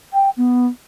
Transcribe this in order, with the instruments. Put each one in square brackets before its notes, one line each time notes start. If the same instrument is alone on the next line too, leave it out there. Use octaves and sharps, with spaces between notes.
[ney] G5
B3